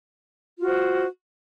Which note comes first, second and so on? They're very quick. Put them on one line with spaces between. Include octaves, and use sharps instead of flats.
F4 F#4 C5